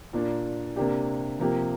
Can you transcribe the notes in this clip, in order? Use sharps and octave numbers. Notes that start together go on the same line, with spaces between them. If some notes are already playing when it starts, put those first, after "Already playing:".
A#2 A#3 D4
C3 A#3 D4 G4
C3 F3 A#3 G4